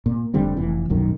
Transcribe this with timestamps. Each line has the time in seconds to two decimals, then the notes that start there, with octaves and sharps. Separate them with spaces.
0.06 A#2
0.34 F1 D3 G3 C4
0.57 F1 E3
0.89 D#1 B1 F#2 D#3